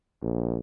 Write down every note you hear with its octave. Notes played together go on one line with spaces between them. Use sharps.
A#1